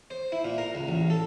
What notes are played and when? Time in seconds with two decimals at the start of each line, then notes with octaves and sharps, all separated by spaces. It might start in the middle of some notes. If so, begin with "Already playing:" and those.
0.10 C5
0.32 E4
0.45 A#2
0.58 A#4
0.75 C#2
0.89 A1
1.10 A4